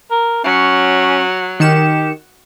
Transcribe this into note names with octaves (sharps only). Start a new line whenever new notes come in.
A#4
F#3 C#4
D#3 G4 C#7 E7